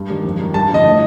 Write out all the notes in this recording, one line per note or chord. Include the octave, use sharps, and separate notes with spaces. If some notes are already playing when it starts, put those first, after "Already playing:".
Already playing: G2
D#3 G3
F2
D#3 G3
G2 A5
D3 F3 D#5
A2